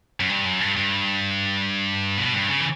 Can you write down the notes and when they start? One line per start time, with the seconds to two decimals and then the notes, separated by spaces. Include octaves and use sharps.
0.20 F#2
0.30 G2
0.45 F#2
0.61 G2
0.76 G2
2.17 B2
2.33 G2
2.49 C#3
2.60 E3